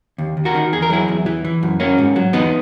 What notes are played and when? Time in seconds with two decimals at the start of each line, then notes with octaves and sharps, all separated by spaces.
0.18 D#2
0.37 D#2
0.45 F#4 A#4
0.55 D#3
0.72 E2 G#4
0.82 A#4
0.90 F#3 E4 G#4
1.08 E2
1.26 E3
1.45 E3
1.63 F#2
1.80 F#3 A#3 C#4
1.98 G#2
2.16 F#3
2.33 E2 B3 D#4